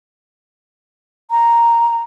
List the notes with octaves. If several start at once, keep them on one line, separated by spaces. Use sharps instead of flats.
A#5